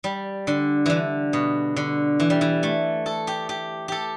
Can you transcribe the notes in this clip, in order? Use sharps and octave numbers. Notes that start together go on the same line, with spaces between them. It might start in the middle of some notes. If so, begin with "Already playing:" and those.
G3
D3
D3 E3
B2
D3
E3
G3
E3
A3
A4
G4
G4
G4 A4